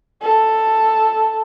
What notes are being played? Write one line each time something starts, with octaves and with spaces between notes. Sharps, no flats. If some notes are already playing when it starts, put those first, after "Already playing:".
A4